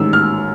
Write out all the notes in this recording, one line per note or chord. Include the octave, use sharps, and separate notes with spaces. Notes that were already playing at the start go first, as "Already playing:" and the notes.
Already playing: A1 G#2 D#3 E6
F6